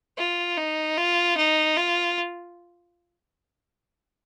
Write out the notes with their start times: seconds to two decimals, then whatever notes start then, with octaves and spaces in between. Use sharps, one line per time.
0.18 F4
0.57 D#4
0.97 F4
1.36 D#4
1.77 F4